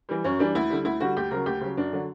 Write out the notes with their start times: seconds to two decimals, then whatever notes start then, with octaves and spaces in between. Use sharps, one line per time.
0.09 E3 G3
0.24 F#2 C#4
0.39 E3 G3 D4
0.55 D2 E4
0.70 D3 G3
0.85 D2 E4
1.00 D3 G3 F#4
1.17 D2 G4
1.31 C#3 F#3 A#4
1.46 D2 G4
1.61 C#3 F#3
1.77 F#2 D4
1.93 D3 F#3